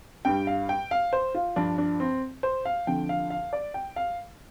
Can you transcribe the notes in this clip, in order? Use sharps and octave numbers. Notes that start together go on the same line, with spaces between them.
G2 G3 G5
F5
G5
F5
C5
F4
G2 F3 D4
D4
C4
C5
F5
F2 D3 F3 G5
F5
F5
D5
G5
F5